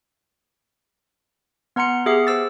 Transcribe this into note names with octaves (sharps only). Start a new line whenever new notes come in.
B3 F#5 A#5 C6 C#7
B3 G4 G#4 E5 C7 C#7
C5 E6 A6